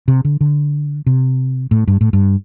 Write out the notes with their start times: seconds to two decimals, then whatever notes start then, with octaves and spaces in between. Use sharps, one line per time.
0.08 C3
0.25 D3
0.41 D3
1.06 C3
1.71 A2
1.87 G2
2.01 A2
2.13 G2